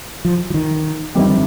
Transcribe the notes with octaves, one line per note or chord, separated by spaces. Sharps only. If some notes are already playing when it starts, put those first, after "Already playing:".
F3
F3
D#3
G1 F2 D#3 G3 C4